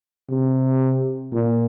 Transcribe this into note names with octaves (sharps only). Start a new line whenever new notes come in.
C3
A#2